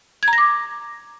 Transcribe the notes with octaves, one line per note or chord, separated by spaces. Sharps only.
G#6
A#5
A#6
D6